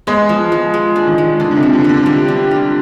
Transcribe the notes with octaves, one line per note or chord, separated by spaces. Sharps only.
G#3 B3
F3
F3
G#3
D4
D#3
G#3
D3 D4
D3
C3
F3
D3
D3 B3
G3
G3
F4